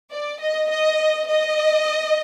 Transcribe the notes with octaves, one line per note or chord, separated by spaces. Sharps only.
D5
D#5
D#5
D#5